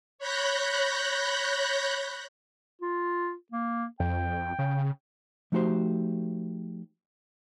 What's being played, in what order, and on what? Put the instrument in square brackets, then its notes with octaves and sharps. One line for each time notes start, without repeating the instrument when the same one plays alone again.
[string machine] C#5 B5 F#6 G6 A#6
[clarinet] F4
A#3
[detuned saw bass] F2 [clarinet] G5
[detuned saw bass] C#3
[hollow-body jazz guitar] F3 A3 D#4 F#4 G4 C5